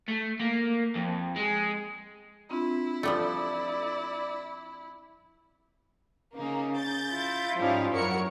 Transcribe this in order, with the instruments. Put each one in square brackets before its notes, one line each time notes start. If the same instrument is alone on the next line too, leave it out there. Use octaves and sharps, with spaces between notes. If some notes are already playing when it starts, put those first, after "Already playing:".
[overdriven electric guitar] A3
A#3
F2
G#3
[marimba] C4 D4 F4 [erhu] E4
[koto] F3 G3 A3 [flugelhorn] D5
[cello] C#3 [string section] A#3 D#4
[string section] G6 A6
[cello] E4 F4
[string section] G#2 G3 D#4 [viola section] F3 C#4 F5
[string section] F#2 F#4 C#7 [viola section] A#4 C#5